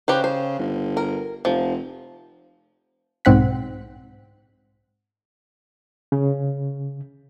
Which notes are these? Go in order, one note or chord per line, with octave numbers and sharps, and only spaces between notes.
C#3 G4 B4 C5
C5
G1
A#4
F1 F3
B1 G#2 C4 F#5 B6
C#3